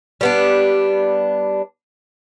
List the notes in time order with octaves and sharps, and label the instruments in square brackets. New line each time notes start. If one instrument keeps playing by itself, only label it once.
[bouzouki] G3 B3 D4